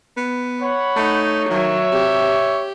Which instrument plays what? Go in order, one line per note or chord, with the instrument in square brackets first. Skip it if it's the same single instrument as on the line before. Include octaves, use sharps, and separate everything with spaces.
[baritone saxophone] B3
[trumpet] C#5 [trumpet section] F#5 B5
[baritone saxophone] A3 [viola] D#4
[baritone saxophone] D#3 [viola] F#3 [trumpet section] E5
[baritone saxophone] C3 [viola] G4